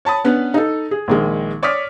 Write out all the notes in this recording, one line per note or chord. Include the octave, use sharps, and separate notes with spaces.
C#5 A5 B5 D#6
B3 C#4 D4 B4
D#4 A4
G#4
A#1 D#3 G#3
C#5 D5 D6 D#6 F6 B6